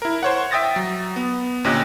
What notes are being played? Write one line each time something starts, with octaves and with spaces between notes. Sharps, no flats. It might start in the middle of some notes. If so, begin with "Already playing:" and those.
E4 A#4
C5 C#5 F#5
E5 G5 D#6 A6 A#6
F#3
B3
D2 A#2 C#4 G4 D#5 F#6